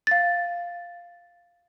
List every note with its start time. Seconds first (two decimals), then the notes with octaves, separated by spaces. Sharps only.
0.07 F5 A6